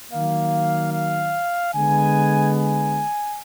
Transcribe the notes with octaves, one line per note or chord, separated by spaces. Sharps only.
D#3 F#3 A#3 F5
F5
D3 G#3 B3 G#5
G#5